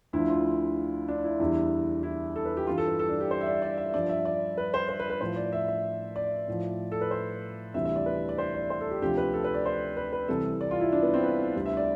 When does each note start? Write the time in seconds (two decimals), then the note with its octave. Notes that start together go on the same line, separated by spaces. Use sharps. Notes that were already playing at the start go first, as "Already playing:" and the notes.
0.13 D2 D3 F3 E4
0.29 F4
1.08 D4
1.24 E4
1.40 E2 D3 G3 E4
2.03 E4
2.36 A4
2.45 B4
2.57 G4
2.67 G2 E3 G3 F4
2.78 A4
2.88 B4
2.99 A4
3.09 D4
3.20 G4
3.31 C5
3.41 E5
3.46 D5
3.62 D5
3.78 E5
3.94 G2 F3 D5
4.09 E5
4.25 D5
4.58 B4
4.74 C5
4.89 C5
5.00 B4
5.10 B4
5.21 A2 F3 C5
5.36 D5
5.53 E5
5.68 E5
6.16 D5
6.48 A2 F3
6.92 A4
7.01 B4
7.11 C5
7.74 D2 C3 E3 G3 E5
7.85 E5
7.96 D5
8.06 B4
8.29 D5
8.38 C5
8.54 D5
8.70 C5
8.81 A4
8.90 G4
9.02 D2 C3 F3 G4
9.17 B4
9.33 A4
9.44 B4
9.54 D5
9.66 C5
9.97 B4
10.13 B4
10.28 C2 C3 E3 A4
10.61 D5
10.71 F4
10.81 E4
10.92 D4
11.03 B3
11.14 C4
11.23 B4
11.55 D2 C3 G3
11.66 E5
11.77 D5